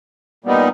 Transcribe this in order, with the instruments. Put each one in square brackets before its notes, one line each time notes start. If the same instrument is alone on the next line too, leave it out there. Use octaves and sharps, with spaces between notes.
[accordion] A#2 G3 B3 D#4